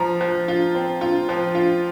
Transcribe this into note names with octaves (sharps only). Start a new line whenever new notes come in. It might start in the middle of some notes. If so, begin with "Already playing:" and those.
Already playing: F3 A#5
F3
F4
C4
F4
F3
F4